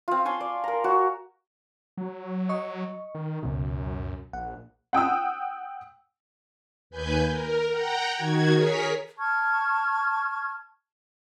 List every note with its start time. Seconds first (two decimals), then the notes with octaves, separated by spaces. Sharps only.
0.08 C4 F4
0.25 C#5 G#5 A5 C6
0.41 D5
0.64 A#4 A#5
0.84 F#4 C#5
1.97 F#3
2.49 D#5 C#6
3.15 D#3
3.43 C#2 F#2 B2
4.33 A#1 F#5
4.93 F#5 G5 D#6 E6
6.90 D#2 B4 G#5 G6
7.29 A#4
7.70 F#5 G5 A#5
8.14 D#3 F#4 G#6
8.52 G#4 A#4 C#5 B6
9.19 A5 C#6 F6 G#6